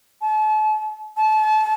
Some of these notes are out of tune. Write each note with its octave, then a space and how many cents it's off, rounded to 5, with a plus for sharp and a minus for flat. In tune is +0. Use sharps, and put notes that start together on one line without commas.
A5 -40
A5 -30